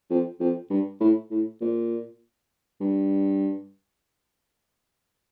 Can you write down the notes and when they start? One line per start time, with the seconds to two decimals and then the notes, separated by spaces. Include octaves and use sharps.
0.11 F2
0.40 F2
0.70 G2
1.00 A2
1.31 A2
1.61 A#2
2.81 G2